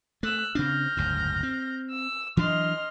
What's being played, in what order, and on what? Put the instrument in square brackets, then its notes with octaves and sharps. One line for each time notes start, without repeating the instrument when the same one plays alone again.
[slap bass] A3 [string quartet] E6 F#6
[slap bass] C#3 C4 D4 [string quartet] F6 G6 A#6
[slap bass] F#1 D2 G#2
C4
[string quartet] E6
[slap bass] E3 F#3 D4 [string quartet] D#5 C6 F6